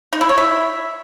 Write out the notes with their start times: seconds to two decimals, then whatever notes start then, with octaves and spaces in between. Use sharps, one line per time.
0.13 D#4
0.21 E4
0.29 C#5
0.38 E5